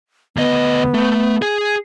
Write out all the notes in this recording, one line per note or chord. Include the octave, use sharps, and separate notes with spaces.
D2 B3 D#5
A3
G#4